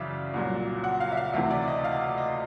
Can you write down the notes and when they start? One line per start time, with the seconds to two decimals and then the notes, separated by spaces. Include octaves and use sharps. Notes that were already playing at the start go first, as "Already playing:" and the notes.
Already playing: F#2 C#3 E3 D5 E5 F5
0.34 C2 A#2 F#3
0.84 F#5
1.00 F5
1.12 E5
1.17 F5
1.34 D2 C3 E3 E5
1.51 D5
1.67 D#5
1.84 F5
2.18 D#5